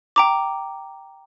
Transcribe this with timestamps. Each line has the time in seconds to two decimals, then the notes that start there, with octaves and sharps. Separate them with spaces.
0.16 G5 A#5 D6